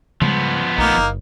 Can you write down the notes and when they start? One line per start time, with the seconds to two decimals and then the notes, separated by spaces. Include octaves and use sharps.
0.22 C#3 F3 G3 G#3 B3
0.78 A#1 A3 A#3 D#4
0.97 F#1